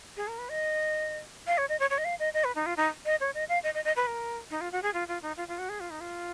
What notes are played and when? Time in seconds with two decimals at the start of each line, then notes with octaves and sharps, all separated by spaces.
0.17 G#4
0.28 A#4
0.38 B4
0.49 D#5
1.47 F5
1.58 C#5
1.69 D#5
1.80 C#5
1.90 C#5
1.98 D#5
2.05 F5
2.19 D#5
2.34 D#5
2.44 B4
2.55 D#4
2.66 F4
2.77 D#4
3.06 D#5
3.20 C#5
3.34 D#5
3.49 F5
3.63 D#5
3.74 D#5
3.85 D#5
3.96 B4
4.07 A#4
4.50 D#4
4.61 F4
4.72 F#4
4.82 G#4
4.94 F4
5.08 F4
5.22 D#4
5.37 F4
5.48 F4
5.59 F#4
5.69 G#4
5.80 F4
5.90 D#4
6.01 F4